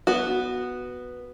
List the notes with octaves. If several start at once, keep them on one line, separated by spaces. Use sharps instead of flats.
B3 F#4